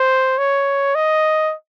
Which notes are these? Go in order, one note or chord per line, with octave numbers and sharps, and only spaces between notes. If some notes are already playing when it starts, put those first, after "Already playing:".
Already playing: C5
C#5
D#5